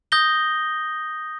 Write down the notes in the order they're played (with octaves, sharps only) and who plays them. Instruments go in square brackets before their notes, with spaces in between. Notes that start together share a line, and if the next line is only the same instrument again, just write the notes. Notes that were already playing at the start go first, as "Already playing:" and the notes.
[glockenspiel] D#6 G6 A#6 G7